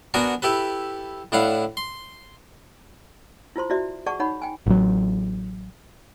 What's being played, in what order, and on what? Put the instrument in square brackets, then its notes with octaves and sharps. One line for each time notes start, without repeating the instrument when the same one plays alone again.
[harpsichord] B3 D4 F#4 A#4 G#5
E4 G4 A4 B4
A2 D4 E4 F5 F#5
C6
[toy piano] E4 F4 C5 C6
E4 F#4 D5 E5
G#4 D5 F#5 A5 C#6
D#4 C#5 F#5 B5
G5 G#5
[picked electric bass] A1 F#3